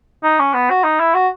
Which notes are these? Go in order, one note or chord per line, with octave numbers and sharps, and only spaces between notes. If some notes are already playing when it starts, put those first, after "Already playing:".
D#4
C#4
B3
F#4
D#4
E4
F#4